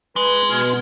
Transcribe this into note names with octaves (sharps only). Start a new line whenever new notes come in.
G#3 B4
B2 F6